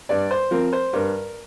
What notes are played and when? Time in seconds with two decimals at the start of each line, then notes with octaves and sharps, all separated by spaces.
0.09 G2 D5
0.31 C5
0.51 F3 C4 A#4
0.73 C5
0.93 G2 A#4